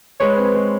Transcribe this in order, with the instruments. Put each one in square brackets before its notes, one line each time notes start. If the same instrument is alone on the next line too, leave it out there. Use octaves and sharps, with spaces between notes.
[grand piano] G#3 [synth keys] B4 C#5
[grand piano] C4
G#3